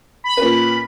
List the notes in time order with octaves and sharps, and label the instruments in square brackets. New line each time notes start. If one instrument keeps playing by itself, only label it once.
[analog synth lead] B5
[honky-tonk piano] A#2 C#4 B4